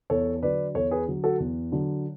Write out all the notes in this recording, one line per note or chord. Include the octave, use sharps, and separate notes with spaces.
E2 A4 C#5
D3 F#3 B4 D5
E2 A4 C#5
G#4 B4
D3 F#3
F#4 A4
E2
D3 F#3